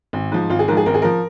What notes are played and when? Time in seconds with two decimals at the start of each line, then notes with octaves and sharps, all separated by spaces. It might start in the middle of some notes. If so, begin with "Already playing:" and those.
0.13 G#1
0.32 G#2 F3
0.50 G#1 F4
0.59 G#4
0.68 G#2 F3 A#4
0.77 G#4
0.86 G#1 A#4
0.94 G#4
1.02 F3 A#4